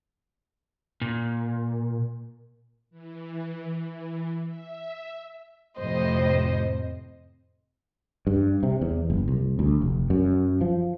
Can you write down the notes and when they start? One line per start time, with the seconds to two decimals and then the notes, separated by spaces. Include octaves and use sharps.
1.01 A#2
2.90 E3
3.69 E3
4.47 E5
5.78 F2 A2 C3 C5 D#5
8.27 G2
8.63 C3
8.81 E2
9.10 F#1
9.28 C2
9.59 D2
9.82 F1
10.10 F#2
10.61 F3